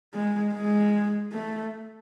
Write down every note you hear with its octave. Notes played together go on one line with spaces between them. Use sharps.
G#3
G#3
A3